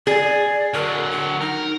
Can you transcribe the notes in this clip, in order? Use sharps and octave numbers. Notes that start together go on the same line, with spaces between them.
G#4 D5
D3 F#3 A#4
F#5
D#4 A#4